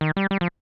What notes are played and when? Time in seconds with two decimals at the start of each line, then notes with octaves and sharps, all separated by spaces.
0.01 D#3
0.17 G3
0.31 G3
0.41 F3